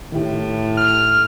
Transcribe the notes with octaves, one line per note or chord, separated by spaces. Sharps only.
A2 D#3 E4 G4
F6